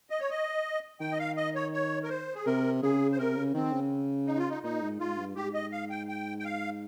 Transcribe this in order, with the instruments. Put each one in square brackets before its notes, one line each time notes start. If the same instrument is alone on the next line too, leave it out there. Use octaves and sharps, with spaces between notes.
[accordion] D#5
C#5
D#5
[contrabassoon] D#3 [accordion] G5
[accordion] D#5
F5
D#5
C#5
C#5
A#4
C5
G#4
[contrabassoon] C3 [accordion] A#4
[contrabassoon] C#3 [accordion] G#4
[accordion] C5
[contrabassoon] C3 [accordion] A#4
[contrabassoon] C#3
[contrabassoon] D#3 [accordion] C4
[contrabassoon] C#3
[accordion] D#4
F4
D#4
[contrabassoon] A#2 [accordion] D#4
[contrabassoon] G#2
[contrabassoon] G#2 [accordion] F4
[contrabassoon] G2
[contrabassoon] G#2 [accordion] G4
[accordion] D#5
F5
G5
G5
G5
F5